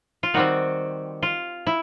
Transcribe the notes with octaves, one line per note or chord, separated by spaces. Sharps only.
F4
D#3 G3 C4 F#4
F4
E4